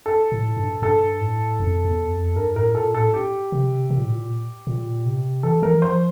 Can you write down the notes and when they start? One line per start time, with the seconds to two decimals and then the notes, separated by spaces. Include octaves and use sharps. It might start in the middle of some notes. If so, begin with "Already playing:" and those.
0.06 A4
0.32 A2
0.57 G2
0.82 G2 A4
1.21 A2
1.60 F2
1.85 E2
2.11 F2
2.36 G2 A#4
2.56 A2 A#4
2.75 A#2 A4
2.94 A2 A4
3.14 G4
3.52 C3
3.90 C3
3.98 A#2
4.04 A2
4.13 A#2
4.67 A#2
5.06 C3
5.43 E3 A4
5.62 E3 A#4
5.82 F3 C5